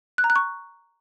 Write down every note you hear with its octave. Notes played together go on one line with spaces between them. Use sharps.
F#6
A#5
F#6
C#6